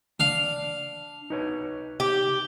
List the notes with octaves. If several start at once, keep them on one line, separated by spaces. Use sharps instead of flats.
D4 F5
D#4 B4 C#5
G4